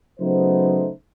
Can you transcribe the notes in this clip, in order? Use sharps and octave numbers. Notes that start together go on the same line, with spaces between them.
C#3 F#3 A3 B3 D#4 C5